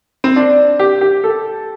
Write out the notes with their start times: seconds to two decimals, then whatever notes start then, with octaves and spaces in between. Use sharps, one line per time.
0.24 C4
0.36 D4
0.79 G4
1.01 G4
1.24 A4